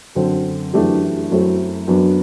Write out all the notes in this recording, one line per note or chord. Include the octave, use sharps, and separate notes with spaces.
F#2 D3 F#3 C4
F#2 E3 A3 D4 G4
F#2 F#3 A3 C4 E4
F#2 F#3 B3 D4 F#4